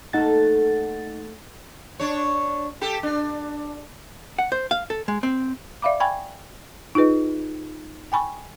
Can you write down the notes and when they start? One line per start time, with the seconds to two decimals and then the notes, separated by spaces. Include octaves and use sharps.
0.13 A3 A#3 D#4 A4 F#5 A6
1.99 D4 C#5
2.81 G4 A4
3.03 D4
4.38 F#5
4.52 C5
4.71 F5
4.90 A4
5.08 G#3
5.23 C4
5.82 D5 E5 F5 B5 D6
6.00 G5 G#5 B5 C#6 G#6
6.95 D#4 F4 G#4 B4 D#5
8.12 G5 G#5 B5 C#6